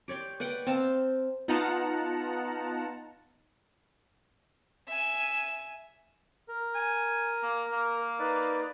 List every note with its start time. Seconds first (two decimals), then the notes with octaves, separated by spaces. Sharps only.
0.08 G4 C#5 D5 C6
0.40 B4 D5 F#5 G5
0.66 C4 F5 A5
1.48 B3 D#4 F4 F#5 A5 A#5
4.88 E5 G#5
6.48 A#4
6.75 G#5
7.43 A#3
7.73 A#3
8.19 D#4 B4 D5